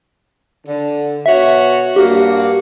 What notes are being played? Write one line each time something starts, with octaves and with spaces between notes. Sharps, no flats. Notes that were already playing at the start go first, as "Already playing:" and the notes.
D3
B2 F#4 C#5 E5
G2 A#3 F#4 G4